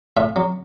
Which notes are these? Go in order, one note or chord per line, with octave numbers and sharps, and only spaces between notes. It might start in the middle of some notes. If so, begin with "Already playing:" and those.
A2 E5
F#3